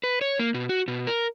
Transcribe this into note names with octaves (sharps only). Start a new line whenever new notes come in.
B4
C#5
A#3
B2
F#4
B2
A#4